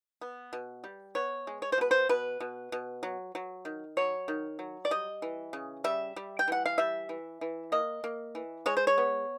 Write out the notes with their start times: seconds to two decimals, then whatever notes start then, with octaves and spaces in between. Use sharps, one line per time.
0.21 B3
0.53 B2
0.84 G3
1.15 B3 C#5
1.47 G#3
1.62 C#5
1.72 C5
1.78 B2 B4
1.91 C5
2.09 B2 B4
2.40 B2
2.72 B2
3.03 F#3
3.35 F#3
3.65 D#3
3.97 F#3 C#5
4.28 D#3
4.59 F#3
4.85 D5
4.91 G3 D#5
5.22 E3
5.53 C#3
5.84 G3 E5
6.16 G3
6.39 G5
6.48 E3 F#5
6.66 F5
6.78 G3 E5
7.09 E3
7.41 E3
7.72 A#3 D#5
8.04 A#3
8.35 E3
8.66 G#3 C#5
8.77 C5
8.87 C#5
8.98 B3